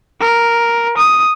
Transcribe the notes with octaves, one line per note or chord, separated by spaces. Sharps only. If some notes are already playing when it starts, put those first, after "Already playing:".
A#4
D#6